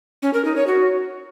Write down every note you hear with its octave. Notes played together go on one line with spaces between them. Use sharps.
C#4
A#4
D#4
C#5
F#4